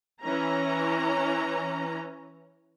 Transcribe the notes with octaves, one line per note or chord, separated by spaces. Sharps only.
E3 C#4 A#5